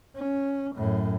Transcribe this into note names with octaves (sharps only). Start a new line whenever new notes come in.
C#4
F#2 A2